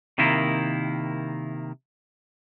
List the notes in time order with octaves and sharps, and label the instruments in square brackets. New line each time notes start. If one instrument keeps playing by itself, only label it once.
[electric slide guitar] C3 D#3 A#3 E4